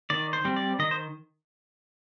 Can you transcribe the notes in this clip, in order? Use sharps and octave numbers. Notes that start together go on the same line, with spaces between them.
D#3 D5
C5
G3 C4
D5
D#3 D#5
C5